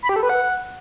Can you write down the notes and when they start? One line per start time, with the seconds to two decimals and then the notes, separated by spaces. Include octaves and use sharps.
0.03 B5
0.09 G4
0.16 A4
0.23 B4
0.29 F#5